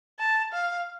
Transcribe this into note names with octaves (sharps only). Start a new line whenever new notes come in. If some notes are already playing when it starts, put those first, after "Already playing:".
A5
F5